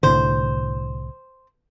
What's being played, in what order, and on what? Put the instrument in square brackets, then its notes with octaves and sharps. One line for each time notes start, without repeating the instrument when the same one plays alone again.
[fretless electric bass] C2 A2 D3 [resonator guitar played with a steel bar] C5